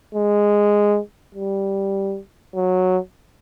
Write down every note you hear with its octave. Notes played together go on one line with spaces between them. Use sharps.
G#3
G3
F#3